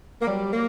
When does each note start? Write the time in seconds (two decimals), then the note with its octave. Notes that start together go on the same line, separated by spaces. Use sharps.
0.22 A#3
0.26 F#3 G3
0.53 F#3 A#3